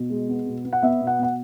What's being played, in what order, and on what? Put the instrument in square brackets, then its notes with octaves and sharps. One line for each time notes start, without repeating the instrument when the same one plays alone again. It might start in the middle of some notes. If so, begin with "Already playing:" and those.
Already playing: [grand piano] B2
G#3
B3
B2
B3
F#5
B3 E5
B2
F#5
B2 F#5